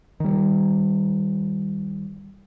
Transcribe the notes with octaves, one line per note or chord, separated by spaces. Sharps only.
D#3 G3